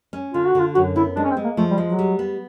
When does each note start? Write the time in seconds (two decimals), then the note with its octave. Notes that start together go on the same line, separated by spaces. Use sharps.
0.13 C#4
0.34 D3 F4
0.47 F#4
0.55 D3 F4
0.75 F#2 F#4
0.96 B3 E4
1.16 G#3 D4
1.24 C#4
1.31 C4
1.37 G#3
1.44 A#3
1.57 F3 A3
1.71 G3
1.78 G#3
1.85 F#3
1.99 G3
2.19 B3